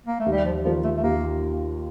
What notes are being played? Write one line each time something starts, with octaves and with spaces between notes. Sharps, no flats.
A#3
A3
D#2
G3
F3
D#3 F3 A#3 F4
A3
A3
D#2 A#3